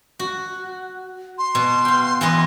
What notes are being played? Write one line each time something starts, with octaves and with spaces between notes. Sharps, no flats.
F#4
C6
B2
F5 G5
E3 B3 D#5